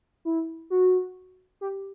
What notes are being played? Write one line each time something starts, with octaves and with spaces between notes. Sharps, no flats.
E4
F#4
G4